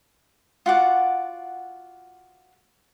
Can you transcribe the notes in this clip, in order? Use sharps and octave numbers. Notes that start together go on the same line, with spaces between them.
F4 F#4 D5 F#5